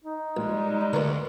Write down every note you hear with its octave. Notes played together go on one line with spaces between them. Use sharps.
D#4
A#1 G3 G#3
D2 A3 B3 A#4